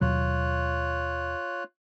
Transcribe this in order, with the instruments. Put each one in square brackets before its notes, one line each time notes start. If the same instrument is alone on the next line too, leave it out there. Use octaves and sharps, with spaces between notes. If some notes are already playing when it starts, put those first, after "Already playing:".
[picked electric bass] D#2 B2 F#3 [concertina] F4 C#5 F#6